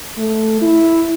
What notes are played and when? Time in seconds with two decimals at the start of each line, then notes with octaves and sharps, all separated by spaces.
0.18 A3
0.62 E4